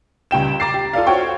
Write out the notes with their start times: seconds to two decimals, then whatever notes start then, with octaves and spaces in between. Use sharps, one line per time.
0.31 C#2 G3 G5 E7
0.60 A#5 D6 A6 C7
0.74 G4
0.93 F4 A4 D5 F5
1.07 F#4 C5 C#5 F5 G5 C#6